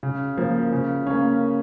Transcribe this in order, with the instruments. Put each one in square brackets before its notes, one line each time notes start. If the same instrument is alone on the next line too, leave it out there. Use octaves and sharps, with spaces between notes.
[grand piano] C#3
F3 A#3
C#3
A#3 C#4